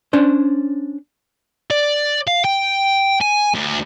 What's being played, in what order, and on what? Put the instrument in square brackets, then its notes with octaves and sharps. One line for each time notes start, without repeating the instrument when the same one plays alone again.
[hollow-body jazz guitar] C#4 D4 C5
[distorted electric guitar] D5
F5
G5
G#5
D2